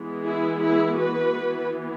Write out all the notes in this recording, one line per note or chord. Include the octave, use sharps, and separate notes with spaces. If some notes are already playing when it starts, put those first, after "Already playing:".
Already playing: E3 G#3 B3
E4 G#4
E4 G#4
F#4 B4
E3 B3